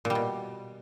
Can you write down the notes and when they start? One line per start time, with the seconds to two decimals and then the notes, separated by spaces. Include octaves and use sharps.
0.05 A#2
0.10 G3
0.15 B2